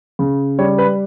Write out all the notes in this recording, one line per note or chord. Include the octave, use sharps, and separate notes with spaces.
C#3
G3 C#5
B4